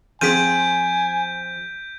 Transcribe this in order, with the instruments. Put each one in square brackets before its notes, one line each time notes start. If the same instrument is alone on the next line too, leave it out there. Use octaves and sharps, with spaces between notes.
[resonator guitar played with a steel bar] F3 C4 G#4 [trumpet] G#5 [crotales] G6 [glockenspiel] B6 D7 D#7